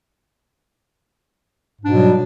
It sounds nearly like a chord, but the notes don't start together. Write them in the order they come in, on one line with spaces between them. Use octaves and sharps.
G#2 D4 B2 F#3 G3